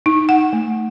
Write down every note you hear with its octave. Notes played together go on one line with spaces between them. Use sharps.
D#4
F#5
A3